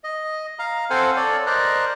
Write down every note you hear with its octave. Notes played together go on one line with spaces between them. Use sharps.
D#5
F5 A#5
C4 A4 C5 F5 F#5 G#5
A4 C#5 D5
A#4 C5 D5 D#5 A#5 F#6